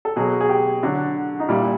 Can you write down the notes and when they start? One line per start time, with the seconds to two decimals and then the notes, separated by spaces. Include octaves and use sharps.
0.05 A4
0.16 B2 F#3 G#4
0.41 G#4
0.49 G4
0.83 D3 F#3 F#4
1.40 D#4
1.48 A#2 G3 E4